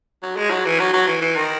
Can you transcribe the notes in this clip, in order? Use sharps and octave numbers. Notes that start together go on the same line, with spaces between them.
F#3
G#3
F#3
E3
F#3
F#3
E3
E3
D#3